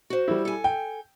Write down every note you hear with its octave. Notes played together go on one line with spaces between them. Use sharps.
F#4 C5
G3 E4
A4 G#5
G5